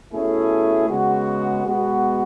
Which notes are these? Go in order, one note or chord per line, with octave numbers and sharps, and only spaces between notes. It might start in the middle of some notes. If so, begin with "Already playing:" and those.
B2 A3 C#4 E4 G#4
C#3 G#3 B3 F#4
B2 G#3 B3 F#4